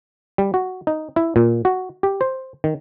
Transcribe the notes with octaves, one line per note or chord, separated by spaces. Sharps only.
G3
F#4
D#4
E4
A#2
F#4
G4
C5
D#3